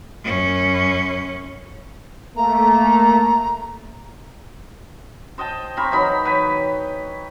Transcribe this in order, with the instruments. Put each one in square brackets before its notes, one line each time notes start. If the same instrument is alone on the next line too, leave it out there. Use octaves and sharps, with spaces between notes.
[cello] F#2 C#4
[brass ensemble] A3 A#3 [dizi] A#5
[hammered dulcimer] C5 D#5 G5 A5
C4 A#4 B5 C#6
E3 F#3 D#4 B5
B4 C#5 G5